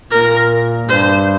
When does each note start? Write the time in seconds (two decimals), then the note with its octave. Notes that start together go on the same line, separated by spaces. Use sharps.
0.11 A#2 A#4
0.88 G2 C5